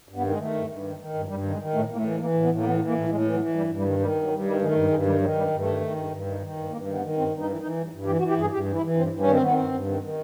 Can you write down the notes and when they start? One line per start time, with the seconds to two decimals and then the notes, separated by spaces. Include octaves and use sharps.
0.09 G2
0.16 B3
0.23 D#3
0.30 G#3
0.39 D#3 A3
0.54 G2
0.68 G2
0.84 D#3
0.99 D#3
1.14 G2
1.28 G2 G3
1.44 D#3
1.51 G#3
1.59 D#3
1.74 A2 A3
1.88 A2 A#3
1.96 A3
2.04 E3
2.19 E3 A#3
2.34 A2
2.42 B3
2.50 A2
2.58 A#3
2.64 E3 B3
2.79 E3
2.87 A#3
2.94 A2
3.09 A2 G#3
3.25 E3
3.32 F#3
3.40 E3
3.55 G2 G3
3.69 G2
3.77 G3
3.84 D#3
3.99 D#3 G3
4.15 G2
4.23 F#3
4.30 G2
4.45 D#3 G3
4.61 D#3 G#3
4.67 A3
4.75 G2
4.90 G2 G#3
5.06 D#3 G3
5.21 D#3 F#3
5.35 G2 G3
5.50 G2
5.59 A3
5.66 D#3
5.81 D#3
5.96 G2
6.11 G2
6.26 D#3
6.41 D#3
6.57 G2
6.70 G2 A#3
6.86 D#3
6.94 B3
7.01 D#3
7.17 G2 C4
7.32 G2
7.39 D#4
7.46 E3
7.61 E3 D#4
7.77 G2
7.92 G2
8.06 E3 G4
8.18 F#4
8.21 E3
8.29 G4
8.37 G2 G#4
8.51 G2 G4
8.67 E3
8.75 E4
8.81 E3
8.97 G2 C4
9.12 G2
9.20 C#4
9.28 D#3 C4
9.42 D#3 B3
9.52 G2 C4
9.72 G2
9.87 D#3
10.03 D#3